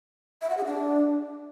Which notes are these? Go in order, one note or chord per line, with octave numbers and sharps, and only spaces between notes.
E5
F#5
G#4
D4